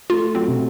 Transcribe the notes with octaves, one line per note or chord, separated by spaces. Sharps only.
A3 F4
F#3 C4
C3